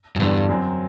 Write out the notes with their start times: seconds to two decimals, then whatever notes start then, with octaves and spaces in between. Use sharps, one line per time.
0.16 F#2
0.20 E2 G2 D3 G3 D4
0.49 F#2 F#3 C4